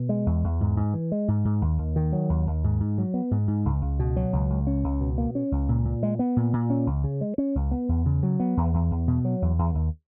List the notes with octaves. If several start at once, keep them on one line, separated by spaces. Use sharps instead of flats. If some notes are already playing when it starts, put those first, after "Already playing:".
Already playing: B2
G#3
E2
E2
G#2
G#2
E3
G#3
G#2
G#2
D#2
D#2
D#3
F#3
D#2
D#2
G#2
G#2
F#3
B3
G#2
G#2
C#2
C#2
B2
F#3
C#2
C#2
C#4
C#2
B2
A#3
C#4
C#2
A#2
A#2
G#3
B3
A#2
A#2
C#4
C#2
C#3
G#3
C#4
C#2
B3
E2
C#3
F#3
B3
E2
E2
E2
B2
F#3
E2
E2
D#2